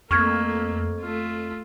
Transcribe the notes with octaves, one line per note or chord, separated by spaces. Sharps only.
F2 A3 A#3 C#6 F6 G#6
A3 F4